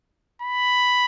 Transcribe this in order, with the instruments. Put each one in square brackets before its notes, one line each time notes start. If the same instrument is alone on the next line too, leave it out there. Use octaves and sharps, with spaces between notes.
[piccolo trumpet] B5